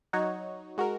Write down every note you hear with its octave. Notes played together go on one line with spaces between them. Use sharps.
F#3 D#4 F#4 C#5
G#3 F#4 A#4